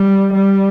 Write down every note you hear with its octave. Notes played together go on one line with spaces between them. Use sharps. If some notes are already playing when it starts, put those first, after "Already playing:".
Already playing: G3
G3